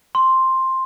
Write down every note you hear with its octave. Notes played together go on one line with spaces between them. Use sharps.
C6